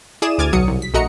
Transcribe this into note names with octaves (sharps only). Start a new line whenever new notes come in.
E4 G#4 D5 D#6 D#7 E7
D2 D6 F6 G#6 A6 D#7
B1 F#3 D#6 C#7
C2
B6
A#1 A3 F#4 D#5 A#5 C#7